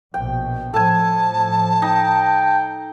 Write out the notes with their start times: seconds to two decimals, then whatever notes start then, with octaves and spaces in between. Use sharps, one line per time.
0.14 A#1 B2 G5
0.74 A2 F3 A4 G#5 A5
1.82 D#4 G5